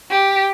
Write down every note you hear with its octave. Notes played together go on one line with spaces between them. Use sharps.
G4